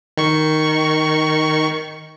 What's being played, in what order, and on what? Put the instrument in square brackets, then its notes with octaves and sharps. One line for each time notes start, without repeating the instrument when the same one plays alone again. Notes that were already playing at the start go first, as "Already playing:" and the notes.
[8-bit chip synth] D#3 C#6